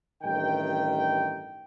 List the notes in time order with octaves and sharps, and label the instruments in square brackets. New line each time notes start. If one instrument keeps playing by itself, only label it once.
[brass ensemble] A1 G2 D#3 G5